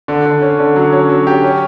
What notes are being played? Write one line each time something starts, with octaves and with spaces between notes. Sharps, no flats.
D3
D3
C#4
D3
F#3
C#4
F#3
G4
C#4